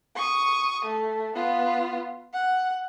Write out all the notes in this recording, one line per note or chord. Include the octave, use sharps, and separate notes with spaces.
C#6 D#6
A3
B3 F4
F#5